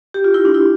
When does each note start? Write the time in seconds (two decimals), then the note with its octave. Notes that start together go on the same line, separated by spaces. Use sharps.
0.14 G4
0.24 F4
0.34 E4
0.45 D4
0.55 E4